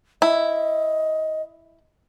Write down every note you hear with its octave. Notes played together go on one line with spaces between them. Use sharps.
E4 D#5